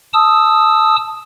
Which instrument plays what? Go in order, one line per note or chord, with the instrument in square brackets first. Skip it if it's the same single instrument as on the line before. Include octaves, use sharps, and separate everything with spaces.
[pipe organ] A5 D#6 E6